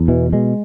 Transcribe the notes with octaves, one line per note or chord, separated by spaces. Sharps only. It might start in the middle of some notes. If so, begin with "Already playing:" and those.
Already playing: E2
B2 E3
B2 G#3